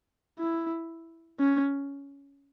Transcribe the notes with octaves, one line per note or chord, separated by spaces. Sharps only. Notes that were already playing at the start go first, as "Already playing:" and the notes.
E4
C#4